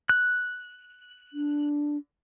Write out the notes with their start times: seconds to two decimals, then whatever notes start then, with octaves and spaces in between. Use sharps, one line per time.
0.09 F#6
1.33 D4